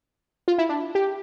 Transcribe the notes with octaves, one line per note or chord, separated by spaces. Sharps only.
F4
E4
D4
G4